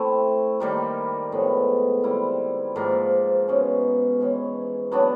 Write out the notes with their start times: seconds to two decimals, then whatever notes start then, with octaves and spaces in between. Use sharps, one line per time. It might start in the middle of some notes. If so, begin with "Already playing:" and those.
Already playing: A3 C4 E4
0.60 D#3 G3 A#3
1.32 A2 F3 G#3 B3
2.03 D#3 G3 C4 E4
2.76 G#2 F3 A#3
3.48 B2 G#3 C#4
4.20 E3 G#3 C#4
4.92 F#3 B3 D4